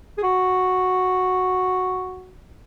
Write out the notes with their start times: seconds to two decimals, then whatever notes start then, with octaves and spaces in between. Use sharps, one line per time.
0.18 G#4
0.23 F#4